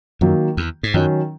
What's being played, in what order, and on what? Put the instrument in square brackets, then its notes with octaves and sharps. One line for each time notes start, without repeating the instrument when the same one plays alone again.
[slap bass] F#2 [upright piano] D#3 F#3 A#3
[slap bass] E2
G#2
[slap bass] F#2 [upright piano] D#3 F#3 C#4